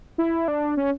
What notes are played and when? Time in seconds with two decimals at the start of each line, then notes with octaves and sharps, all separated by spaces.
0.18 E4
0.48 D4
0.77 C#4